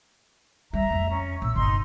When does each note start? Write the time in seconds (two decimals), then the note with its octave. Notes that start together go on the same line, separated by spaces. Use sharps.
0.73 G3 E5 A#5
0.90 F2 A3
1.09 C#4
1.42 A#1 E6
1.56 G1 C3 D#4 C6